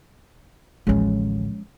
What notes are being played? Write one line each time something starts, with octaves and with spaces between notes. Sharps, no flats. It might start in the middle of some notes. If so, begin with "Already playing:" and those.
A1 D2 F3 G#3 C#4